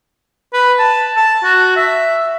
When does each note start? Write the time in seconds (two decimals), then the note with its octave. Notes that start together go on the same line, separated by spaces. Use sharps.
0.53 B4
0.79 A5
1.16 A5
1.44 F#4
1.76 E5